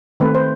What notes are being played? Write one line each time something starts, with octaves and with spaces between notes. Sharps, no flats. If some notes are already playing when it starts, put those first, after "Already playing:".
D#3 A3 C4 B4
C5